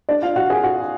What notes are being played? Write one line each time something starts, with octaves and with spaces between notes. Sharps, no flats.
D4 D5
F4 F5
F#4 F#5
G#4 G#5
F#4 F#5